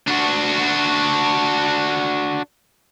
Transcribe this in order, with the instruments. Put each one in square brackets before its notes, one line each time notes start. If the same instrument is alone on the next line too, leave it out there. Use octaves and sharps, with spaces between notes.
[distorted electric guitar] D4 F#4